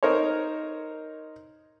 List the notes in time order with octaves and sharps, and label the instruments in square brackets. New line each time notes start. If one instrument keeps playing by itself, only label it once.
[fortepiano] D#4 A#4 C5 C#5